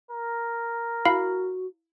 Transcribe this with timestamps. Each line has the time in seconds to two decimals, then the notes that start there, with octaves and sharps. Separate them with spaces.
0.11 A#4
1.05 E4 F#4 F5 B5